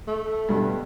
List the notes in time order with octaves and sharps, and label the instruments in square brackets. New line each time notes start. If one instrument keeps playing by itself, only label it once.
[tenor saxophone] A3
[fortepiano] G2 B2 D3